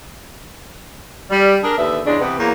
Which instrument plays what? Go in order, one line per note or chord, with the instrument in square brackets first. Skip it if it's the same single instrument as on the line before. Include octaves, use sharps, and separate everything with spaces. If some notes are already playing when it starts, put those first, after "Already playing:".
[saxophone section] G3
D4 G#4 A#4
D#2 D3 B3 E5
E2 C#3 G#3 D4
C3 E3 B3
E2 F#3 A#3